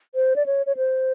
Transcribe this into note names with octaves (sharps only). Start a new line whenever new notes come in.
C5
D5
C#5
C#5
C5